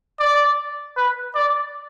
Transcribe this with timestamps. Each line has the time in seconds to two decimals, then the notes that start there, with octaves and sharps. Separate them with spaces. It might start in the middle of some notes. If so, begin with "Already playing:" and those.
0.20 D5
0.97 B4
1.35 D5